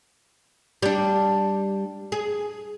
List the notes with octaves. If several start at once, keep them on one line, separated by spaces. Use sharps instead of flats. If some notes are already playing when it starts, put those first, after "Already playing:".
G3 D4
G#4